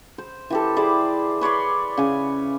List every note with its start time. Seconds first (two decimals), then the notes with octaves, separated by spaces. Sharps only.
0.18 C5
0.50 E3 G4 A4
0.76 E4 G#4 C5 D5
1.41 B4 C#5 D5 C6
1.97 C#3 G#5